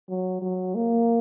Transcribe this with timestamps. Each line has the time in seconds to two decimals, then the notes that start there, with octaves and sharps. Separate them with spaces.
0.09 F#3
0.42 F#3
0.75 A#3